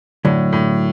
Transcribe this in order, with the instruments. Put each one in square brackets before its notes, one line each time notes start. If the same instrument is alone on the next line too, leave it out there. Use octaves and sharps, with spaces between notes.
[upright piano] A2 [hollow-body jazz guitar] D3 F#3
[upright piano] A2